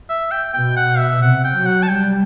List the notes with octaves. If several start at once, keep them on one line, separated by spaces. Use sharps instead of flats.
E5
G5
B2 G5
F#5
E5
C3 F#5
G5
F#3
F#5
A5
G3 G5